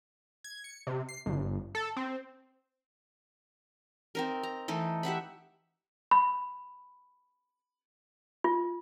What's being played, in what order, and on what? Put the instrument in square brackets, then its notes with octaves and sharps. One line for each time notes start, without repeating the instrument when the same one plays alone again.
[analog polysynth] G#6
C#7
C3
C7
G1
A4
C4
[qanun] C4 D#4 A#4
A#5
E3 A3 D#4 A4
G4 E5 F#5 B5
[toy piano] B5
F4